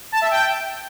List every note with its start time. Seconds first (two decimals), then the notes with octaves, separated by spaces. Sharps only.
0.12 A5
0.21 E5
0.31 G5